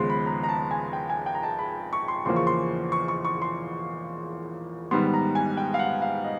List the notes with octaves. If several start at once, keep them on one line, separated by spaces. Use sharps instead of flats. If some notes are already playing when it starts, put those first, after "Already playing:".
Already playing: D#2 C#3 F3 G#3 B3 C6
B5
A#5
A#5
A5
G#5
G5
G#5
G5
A#5
A5
B5
C#6
C6
E2 C#3 F3 A#3 C6
C#6
C6
C#6
C#6
C#6
C6
G#2 D#3 G3 B3 C6
A#5
G#5
G5
F5
F#5
F5
D#5